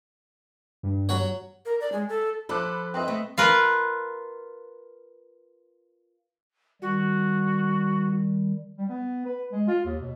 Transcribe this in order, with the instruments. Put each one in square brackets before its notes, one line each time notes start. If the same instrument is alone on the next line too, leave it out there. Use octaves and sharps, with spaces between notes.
[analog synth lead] G2
[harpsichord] F#3 F#4 C#5
[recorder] A#4
D5
G#3
A4
[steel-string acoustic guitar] F3 A4 [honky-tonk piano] B5 D6 F#6
[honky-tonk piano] C4 B4 D#5
[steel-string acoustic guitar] A3
[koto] F4 A#4 B4
[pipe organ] D#3 G3 [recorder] F#4
[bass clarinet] G3
B3
B4
G#3
F4
D#2
B2